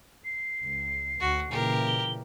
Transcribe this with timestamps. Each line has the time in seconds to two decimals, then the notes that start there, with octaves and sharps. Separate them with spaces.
0.25 C7
0.60 C#2
1.20 D2 F#4
1.51 A#2 C#3 E3 G4 A#4
1.87 G7